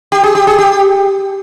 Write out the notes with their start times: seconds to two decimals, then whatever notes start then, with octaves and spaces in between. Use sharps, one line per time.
0.12 G4
0.24 G#4
0.35 G4
0.47 G#4
0.59 G4